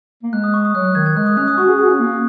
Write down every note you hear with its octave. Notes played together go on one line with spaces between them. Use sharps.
A#3
G#3 F#6
D#6
C#6
D#6
F#3 F#6
F#6
D#3 G#6
G#6
G#3 F#6
D#6
C#4 F#6
D#6
F#4 C#6
G#4
F#4 D#6
C#4
A#3